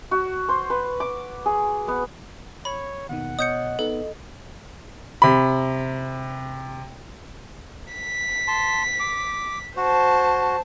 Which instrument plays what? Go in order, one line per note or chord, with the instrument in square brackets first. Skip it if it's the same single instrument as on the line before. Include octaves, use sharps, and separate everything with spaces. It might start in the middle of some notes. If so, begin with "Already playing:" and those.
[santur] F#4
C5
B4
D6
G#4
B3
[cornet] C#5 [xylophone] B5
[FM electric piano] D#2 B2 D#3 [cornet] F#5
[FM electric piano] B2 C#5 [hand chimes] D#5 [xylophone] D#6 G6 C#7
[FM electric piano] B3 D#4 [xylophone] A4
[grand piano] C3 B5
[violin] B6
[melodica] A5 C6
D6
[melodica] F#4 [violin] C5 A5